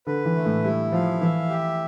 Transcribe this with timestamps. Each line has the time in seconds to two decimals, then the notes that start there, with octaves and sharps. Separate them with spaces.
0.07 D3 B4
0.25 E3
0.35 A3
0.45 A2
0.64 G3 E4
0.92 F3 F5
1.21 E3 E5
1.49 G4